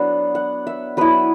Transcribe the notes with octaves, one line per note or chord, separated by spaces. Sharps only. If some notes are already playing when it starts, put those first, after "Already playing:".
Already playing: F#3 B3 D4 F#5
F#5
E5
F#3 B3 E4 B4